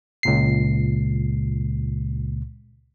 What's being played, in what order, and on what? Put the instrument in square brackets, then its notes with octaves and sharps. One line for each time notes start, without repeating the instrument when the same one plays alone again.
[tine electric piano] C#2 A#2 C7